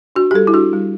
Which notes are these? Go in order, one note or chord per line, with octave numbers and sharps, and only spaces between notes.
D4 F#4
G4
G3 A4
E4
D4 F#4
G3